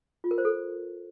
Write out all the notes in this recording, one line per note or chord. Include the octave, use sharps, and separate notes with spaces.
F4
A#4
C5
A4